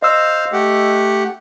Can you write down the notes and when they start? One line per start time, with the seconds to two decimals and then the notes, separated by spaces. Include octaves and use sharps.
0.02 C5 D#5 F5 E6
0.53 A3 G4 F#5